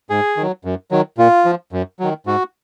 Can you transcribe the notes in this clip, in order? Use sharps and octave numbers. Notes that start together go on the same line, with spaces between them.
G#2 G#4
D#3 F#3
F#2
D#3 F#3
A#2 F4
F3
F#2
D#3 F#3
G#2 F#4